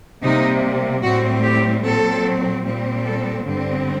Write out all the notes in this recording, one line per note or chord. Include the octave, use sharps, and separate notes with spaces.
C3 G3 A#3 D#4
A2 G3 C4 F#4
G4
A#2 F#3 C4 A4
A#2 G3 C4
A4
G2 D3 G3 C4